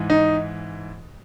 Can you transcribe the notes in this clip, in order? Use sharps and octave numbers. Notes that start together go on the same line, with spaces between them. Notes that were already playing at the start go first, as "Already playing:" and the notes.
Already playing: G#2 E3
D#4